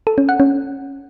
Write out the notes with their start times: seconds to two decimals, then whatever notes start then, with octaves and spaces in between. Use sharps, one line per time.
0.07 A4
0.18 C#4
0.29 F#5
0.40 C#4